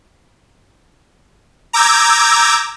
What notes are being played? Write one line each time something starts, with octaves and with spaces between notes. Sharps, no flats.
A#5 D6 E6 G6 G#6